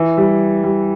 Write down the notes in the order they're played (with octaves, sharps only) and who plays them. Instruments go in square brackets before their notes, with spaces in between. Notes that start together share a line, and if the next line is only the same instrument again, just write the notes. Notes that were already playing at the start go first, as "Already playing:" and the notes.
Already playing: [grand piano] E3
G3
G3